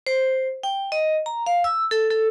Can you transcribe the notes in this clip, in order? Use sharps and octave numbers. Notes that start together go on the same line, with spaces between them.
C5
G5
D#5
A#5
F5
E6
A4
A4